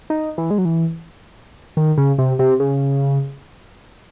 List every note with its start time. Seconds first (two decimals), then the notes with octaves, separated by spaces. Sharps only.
0.10 D#4
0.38 E3
0.51 G#3
0.58 F#3
0.65 E3
1.77 D#3
1.98 C#3
2.18 C3
2.39 C3
2.60 C#3